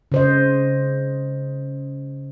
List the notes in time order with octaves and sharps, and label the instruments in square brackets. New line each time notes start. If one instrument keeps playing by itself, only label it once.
[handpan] C#3 C5 D#5